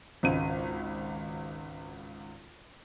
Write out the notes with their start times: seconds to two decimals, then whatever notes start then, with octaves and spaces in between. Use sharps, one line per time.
0.23 G#1 C#2 D#7